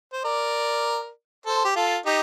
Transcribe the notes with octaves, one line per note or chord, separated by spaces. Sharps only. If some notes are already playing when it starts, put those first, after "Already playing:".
C5
A#4 D5
A4 C5
G4
F4 A4
D#4 G4